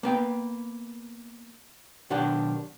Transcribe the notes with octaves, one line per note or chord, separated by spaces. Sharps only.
A#3 B3 G5
B1 D#3 D4 G4 F#5